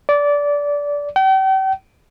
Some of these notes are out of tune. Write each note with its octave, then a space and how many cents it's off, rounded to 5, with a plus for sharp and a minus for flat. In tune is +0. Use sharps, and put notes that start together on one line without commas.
D5 -20
G5 -40